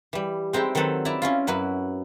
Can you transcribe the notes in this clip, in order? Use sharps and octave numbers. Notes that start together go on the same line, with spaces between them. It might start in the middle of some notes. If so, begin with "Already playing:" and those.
E3 G3
G#3 C4 D#4 E4 G5
D#3 F#3 C4 A4 B4
E4 D5 E5 A#5
C#4 E4 F4
F#2 F#3 E4 B4